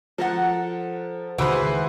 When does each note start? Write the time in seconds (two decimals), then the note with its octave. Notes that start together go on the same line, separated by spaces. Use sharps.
0.18 F3 A4 A#4 F#5
1.38 C#2 D#3 E3 F#4 G#4 B4 C5